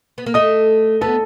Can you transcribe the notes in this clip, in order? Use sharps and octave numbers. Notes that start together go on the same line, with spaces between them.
B3
A#3
A3 D#5 D#6
B3 A4 A5